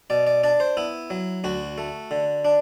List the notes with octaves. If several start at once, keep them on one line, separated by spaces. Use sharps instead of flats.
B2 D5
D5
D4 D5
C5
B3 E4
F#3
D2 F#4
A3
D3
D4